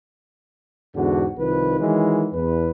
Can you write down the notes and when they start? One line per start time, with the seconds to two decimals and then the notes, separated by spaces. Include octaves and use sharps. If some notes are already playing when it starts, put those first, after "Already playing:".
0.95 E2 G#2 D3 F#4
1.38 C2 D#3 F3 B4
1.80 D#3 E3 F#3 G#3
2.33 E2 B4